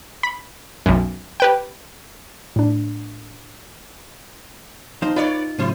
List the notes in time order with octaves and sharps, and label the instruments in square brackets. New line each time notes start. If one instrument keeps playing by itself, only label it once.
[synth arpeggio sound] B5
B1 F#2
G4 B4 G5
[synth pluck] A2 D4
[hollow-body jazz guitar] F3 D#4 C5
[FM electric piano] D#4 [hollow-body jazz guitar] F4 [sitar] B4 C#5 D5
[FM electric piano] A2 C#3 F#3 [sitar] E4 C5